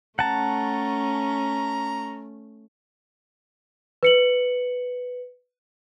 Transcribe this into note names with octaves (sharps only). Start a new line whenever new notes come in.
A3 C#4 F#5 A5 A#5
B4 C#7 F#7